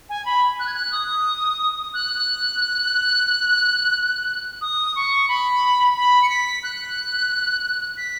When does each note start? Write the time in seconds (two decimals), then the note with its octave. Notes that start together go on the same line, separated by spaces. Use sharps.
0.09 G#5
0.25 B5
0.59 F#6
0.66 G#6
0.74 F#6
0.92 D#6
1.94 F#6
4.61 D#6
4.96 C#6
5.28 B5
5.96 B5
6.22 C#7
6.29 B6
6.63 F#6
7.97 B6